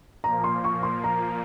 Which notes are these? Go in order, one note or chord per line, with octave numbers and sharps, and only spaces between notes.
A#2 F3 A#3 A#5
C6
C#6
C6
A#5